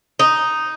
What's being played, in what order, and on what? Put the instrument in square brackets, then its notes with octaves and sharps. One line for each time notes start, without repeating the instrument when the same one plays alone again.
[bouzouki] D#4